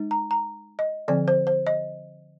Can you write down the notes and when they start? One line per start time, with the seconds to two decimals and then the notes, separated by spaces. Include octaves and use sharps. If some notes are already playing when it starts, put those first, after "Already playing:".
Already playing: G#3 D#4
0.11 A#5
0.31 A#5
0.79 D#5
1.08 D3 F3 C4 D5
1.28 C5
1.47 C5
1.67 D#5